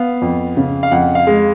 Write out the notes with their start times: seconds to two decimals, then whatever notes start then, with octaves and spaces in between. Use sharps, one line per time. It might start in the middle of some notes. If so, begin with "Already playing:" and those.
Already playing: B3 F5
0.22 F2
0.57 C#3
0.83 F5
0.91 F2 F#5
1.15 F5
1.27 G#3